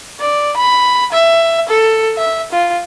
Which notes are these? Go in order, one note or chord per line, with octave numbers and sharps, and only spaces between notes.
D5
B5
E5
A4
E5
F4